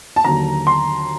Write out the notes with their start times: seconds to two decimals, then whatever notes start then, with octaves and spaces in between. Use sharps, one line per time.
0.16 A5
0.24 D#2 D3 F#3 A#5
0.67 C6